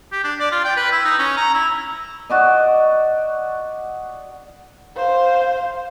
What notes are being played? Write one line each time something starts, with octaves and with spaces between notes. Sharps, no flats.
G4
D4
D5
F4
G5
B4
E4
D#4
C#4
A#5
E4
F#4 D5 D#5
C5 F5